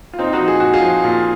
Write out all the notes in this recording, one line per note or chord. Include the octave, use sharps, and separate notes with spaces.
F4
A#2 C4 D#4
D#4 F#4
F3
G#4
A#2 F#4
F4 G#4
F3
A#2